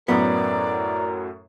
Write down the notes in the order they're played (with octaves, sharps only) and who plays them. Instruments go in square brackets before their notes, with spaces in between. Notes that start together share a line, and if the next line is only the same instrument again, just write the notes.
[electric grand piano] F#2 A2 F#3 [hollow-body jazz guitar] B3 [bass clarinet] A#4 [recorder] D5